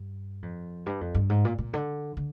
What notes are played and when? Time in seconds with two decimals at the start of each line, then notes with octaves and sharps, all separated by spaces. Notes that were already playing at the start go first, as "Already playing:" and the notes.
Already playing: G2
0.42 F2
0.86 G2
1.01 F2
1.15 G2
1.30 G#2
1.45 A#2
1.58 A#2
1.73 D3
2.17 D3